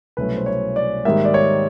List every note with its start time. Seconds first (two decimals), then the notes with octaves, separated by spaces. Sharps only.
0.17 C2 B2 F#3 A3 C#4 B4
0.36 C5
0.46 C#5
0.76 D5
1.05 G#2 D#3 G3 A#3 E5
1.25 D5
1.34 C#5